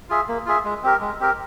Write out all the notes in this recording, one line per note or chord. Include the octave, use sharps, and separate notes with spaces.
F4 G#4 E5
A#3
F4 G#4 E5
G#3
C4 G4 A#4
G#3
C4 G4 A#4